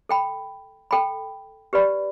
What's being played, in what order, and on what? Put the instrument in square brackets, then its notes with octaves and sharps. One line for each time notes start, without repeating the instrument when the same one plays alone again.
[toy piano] A4 G5 B5
A4 G5 B5
G4 B4 D5 B5